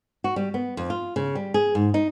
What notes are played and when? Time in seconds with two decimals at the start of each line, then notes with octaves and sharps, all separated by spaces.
0.24 F#4
0.36 G3
0.54 B3
0.77 F2
0.90 F4
1.16 C#3
1.35 G3
1.54 G#4
1.75 G#2
1.94 D#4